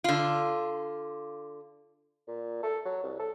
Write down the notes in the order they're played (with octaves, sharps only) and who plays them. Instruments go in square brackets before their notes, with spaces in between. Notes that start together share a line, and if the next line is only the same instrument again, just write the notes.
[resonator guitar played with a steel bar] D3 F4
[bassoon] A#2
A4
F#3
C2
A4